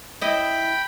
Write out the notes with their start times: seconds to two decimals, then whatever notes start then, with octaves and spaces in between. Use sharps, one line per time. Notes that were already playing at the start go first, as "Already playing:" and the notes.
0.21 E4 D#5 G5 B5